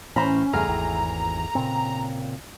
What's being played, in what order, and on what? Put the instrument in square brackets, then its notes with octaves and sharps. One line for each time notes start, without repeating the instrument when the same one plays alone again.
[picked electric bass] A2 E3 [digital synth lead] C#4 [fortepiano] C5 A#5 B5
[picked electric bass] E2 G2 C#3 [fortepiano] A3 G#4 F6 [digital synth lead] A#5
[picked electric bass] G#1 E2 E3
A#2 C#3 C4